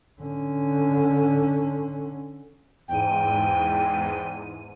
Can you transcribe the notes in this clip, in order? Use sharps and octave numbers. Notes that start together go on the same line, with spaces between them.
D3 C#4
E2 G#2 G5 D#7